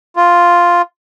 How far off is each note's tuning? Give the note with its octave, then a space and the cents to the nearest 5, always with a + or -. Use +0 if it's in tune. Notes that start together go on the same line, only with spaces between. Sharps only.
F4 +0